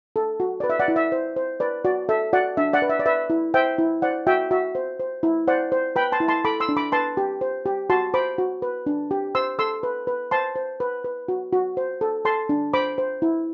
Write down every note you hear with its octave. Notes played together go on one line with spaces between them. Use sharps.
A4
F#4
B4 D5
E5
D5 F#5
E4
E5
C5
C5
B4 D5
F#4 D5
A4 E5
F#4 D5 F#5
D4 E5
D5 F#5
B4
E5
D5
B4 E5
E4
C5 E5 G5
E4
C5 D5 F#5
F#4 E5 G5
F#4 E5
C5
C5
E4
C5 D5 F#5
C5
B4 G5 B5
A5 C6
E4
A5 C6
A4 B5 D6
C6 E6
D4
B5 D6
B4 A5 C6
G4
C5
G4
F#4 A5 C6
C5 B5 D6
F#4
B4
D4
G4
C5 C6 E6
A4 C6 E6
B4
B4
C5 A5 C6
C5
B4
B4
F#4
F#4
C5
A4
A4 A5 C6
D4
C5 B5 D6
C5
E4